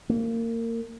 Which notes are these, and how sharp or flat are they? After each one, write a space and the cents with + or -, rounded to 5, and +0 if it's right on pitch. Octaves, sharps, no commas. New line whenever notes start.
A#3 -25